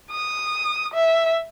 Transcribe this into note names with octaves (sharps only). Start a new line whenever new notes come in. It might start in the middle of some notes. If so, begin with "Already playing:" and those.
D#6
E5